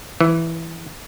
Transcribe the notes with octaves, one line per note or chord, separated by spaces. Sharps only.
E3